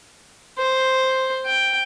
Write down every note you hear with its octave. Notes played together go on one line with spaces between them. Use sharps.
C5
G5